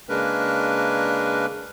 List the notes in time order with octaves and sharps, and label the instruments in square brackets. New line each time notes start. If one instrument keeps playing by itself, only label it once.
[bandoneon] C#3 G#3 A#3 D4 A#4 B4